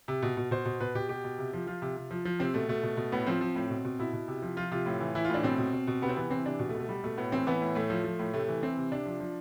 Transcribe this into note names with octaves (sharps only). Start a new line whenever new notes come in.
C3
B2
B2
B2 C5
B2
B2 B4
B2 G4
B2 G4
B2
C3
F3
F3 F4
C3
C3
F3
F3
C3 C4
B2 A3
B2 A3
B2
B2
A2 B3
F3 C4
F3
A2
B2
B2
B2 E4
B2
C3
F3
F3 F4
C3 F4
A2
E3
E3 E4
F4
A2 D4
B2 C4
B2
B2
B2
C3 B3
C4
E3 B3
E3 C4
C3 D4
B2
A3
B2
A3
B2 G3
B2 A3
A2 B3
E3 C4
E3 B3
A2
A2 A3
F3
F3
A2
C3 A3
E3
E3 C4
C3
C3 D4
F3
F3